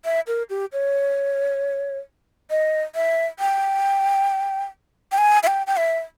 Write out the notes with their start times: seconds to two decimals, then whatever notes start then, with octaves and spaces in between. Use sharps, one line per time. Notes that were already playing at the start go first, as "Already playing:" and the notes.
0.05 E5
0.27 A#4
0.50 G4
0.73 C#5
2.50 D#5
2.95 E5
3.39 G5
5.12 G5
5.18 G#5
5.43 E5
5.47 G5
5.67 G5
5.77 E5